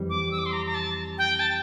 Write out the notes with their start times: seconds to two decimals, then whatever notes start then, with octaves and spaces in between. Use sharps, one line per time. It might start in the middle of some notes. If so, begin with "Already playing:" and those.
Already playing: F2 E3 G3 C4
0.10 D6
0.32 E6
0.39 D6
0.46 C6
0.53 A#5
0.66 A#5
0.74 A5
1.18 G5
1.40 A5